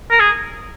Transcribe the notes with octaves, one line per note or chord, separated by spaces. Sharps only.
A#4
G#4